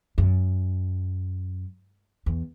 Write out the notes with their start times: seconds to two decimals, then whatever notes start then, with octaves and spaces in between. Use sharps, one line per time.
0.18 F#2
2.26 E2